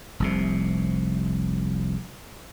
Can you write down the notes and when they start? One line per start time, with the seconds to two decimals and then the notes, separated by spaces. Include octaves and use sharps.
0.20 F1 C2 C3